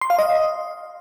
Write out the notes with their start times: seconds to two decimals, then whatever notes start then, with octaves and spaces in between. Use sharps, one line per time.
0.01 C6
0.10 F5
0.19 D#5